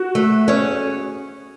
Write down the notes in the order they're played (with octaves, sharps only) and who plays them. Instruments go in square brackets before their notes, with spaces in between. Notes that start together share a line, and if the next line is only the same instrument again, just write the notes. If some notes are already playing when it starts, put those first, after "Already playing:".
Already playing: [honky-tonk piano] F#4
[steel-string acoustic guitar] A3
C#4 G#4 C#5